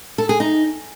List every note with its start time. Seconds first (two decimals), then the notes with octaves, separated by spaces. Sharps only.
0.18 A4
0.29 G#4
0.40 D#4